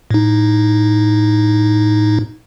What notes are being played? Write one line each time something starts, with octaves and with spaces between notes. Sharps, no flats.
A2 D#4